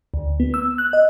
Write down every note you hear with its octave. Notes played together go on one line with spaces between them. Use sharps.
D2
B3
E6
F#6
D#5